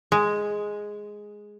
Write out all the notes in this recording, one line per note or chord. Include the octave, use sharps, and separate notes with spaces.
G#3